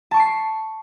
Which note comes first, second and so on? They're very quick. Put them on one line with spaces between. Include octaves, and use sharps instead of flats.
A5 C#6 D7 C7